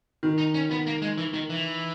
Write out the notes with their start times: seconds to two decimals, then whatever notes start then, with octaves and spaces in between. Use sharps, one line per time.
0.23 D#3
0.38 D#4
0.54 C#4
0.71 B3
0.87 A#3
1.02 G#3
1.18 E3
1.34 D#3
1.50 E3